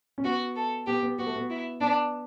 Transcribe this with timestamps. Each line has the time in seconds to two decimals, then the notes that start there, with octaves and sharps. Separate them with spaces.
0.18 C#4
0.24 B3 F#4
0.56 A4
0.86 B3 G4
1.03 B3
1.19 B3 F#4
1.26 A3
1.36 B3
1.50 E4
1.80 B3 D4